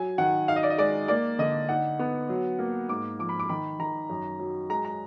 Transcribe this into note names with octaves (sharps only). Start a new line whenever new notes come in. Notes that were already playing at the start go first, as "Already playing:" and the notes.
Already playing: F#3 G#5
D#3 F#5
D#4 F5
D#5
D5
D#5
G#3 D5
A#3 D5
D3 D#5
D#4 F#5
B3
F#3
A#3
G#2 D6
F3 D6
B5
D6
D#3 B5
D#3 A#5
F#2
F#3
G#3 A#5
A#5